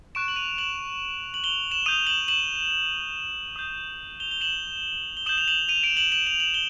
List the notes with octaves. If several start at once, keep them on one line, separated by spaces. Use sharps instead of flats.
C#6 F#6 D7 E7
F#7
D#7 F7
E7 F#7
F#7
F7 G7
E7 F#7
D#6 G6 D#7 F7
E7 F#7
E7 F#7
D#6 G6
F7 G7
G7
E7 F#7
G7
D#6 G6 E7 F#7
F7
E7 F#7
D#7 F7
D7 E7
E7 F#7
E7 F#7
F7
F#7
G7